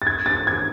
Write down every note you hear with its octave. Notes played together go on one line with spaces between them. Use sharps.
A6
G#6
A6
G#6